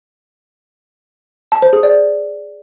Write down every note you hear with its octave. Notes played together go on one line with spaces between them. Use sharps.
A5
C5
G#4
D5